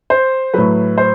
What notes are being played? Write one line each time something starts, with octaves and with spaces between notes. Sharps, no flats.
C5
A2 F#3 B4
C5